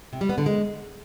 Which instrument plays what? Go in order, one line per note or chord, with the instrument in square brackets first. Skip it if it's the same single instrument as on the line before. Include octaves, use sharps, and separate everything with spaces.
[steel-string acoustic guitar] C3
G3
B3
D3
G#3